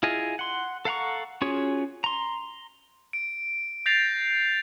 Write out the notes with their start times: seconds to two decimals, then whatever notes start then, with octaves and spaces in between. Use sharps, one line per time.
0.03 E4 F4 G#4 D#5
0.39 F#5 C6
0.85 A4 F5 F#5 A#5 C#6
1.42 C#4 F4 F#4 G#4 C#5
2.04 A#5 C6
3.13 D7
3.86 G6 A6 A#6 C7 F7